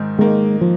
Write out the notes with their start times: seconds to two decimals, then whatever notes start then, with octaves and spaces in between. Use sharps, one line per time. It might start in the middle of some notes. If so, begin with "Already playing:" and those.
Already playing: G#2 D#3
0.18 D#3 G#3 A#3
0.61 F3